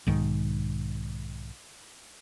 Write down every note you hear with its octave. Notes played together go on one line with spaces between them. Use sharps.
B1 G#2 D#3